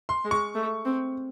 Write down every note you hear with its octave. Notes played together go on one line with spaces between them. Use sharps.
C6
G#3
C#6
A3
C4